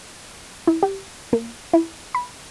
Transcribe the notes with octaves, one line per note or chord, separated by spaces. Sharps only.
E4
G4
A#3
E4
B5